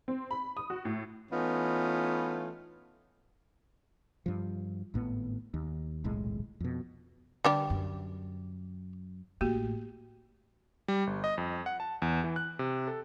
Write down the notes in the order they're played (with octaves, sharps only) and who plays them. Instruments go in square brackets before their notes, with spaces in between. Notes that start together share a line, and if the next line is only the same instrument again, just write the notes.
[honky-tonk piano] C4
B5
D#6
F#4
A2
[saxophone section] E3 A3 B3 C#4 D#4 F4
[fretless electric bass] G2 F3
G#1 A2 B3
D#2
D#1 B1 A2 G#3
F2 B2
[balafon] D3 B5 [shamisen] G3 D4 G4
[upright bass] F#2
[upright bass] A1 A2 [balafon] A#3 F#4 G4
[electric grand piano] G3
G1
D#5
F2
F#5
A5
E2
E3
F#6
C3
A4